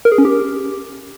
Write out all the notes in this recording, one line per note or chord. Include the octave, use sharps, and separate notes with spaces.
A#4
G#4
C#4
G4